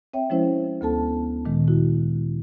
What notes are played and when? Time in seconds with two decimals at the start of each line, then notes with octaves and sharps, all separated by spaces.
0.13 C4 C#5 E5 G5
0.30 F3 G#3 C#4 E4 C5
0.81 D2 B3 A4 A5
1.45 A#2 D#3 G#3
1.68 E4 F#4